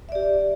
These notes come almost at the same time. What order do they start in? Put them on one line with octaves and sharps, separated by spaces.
E5 D5 G4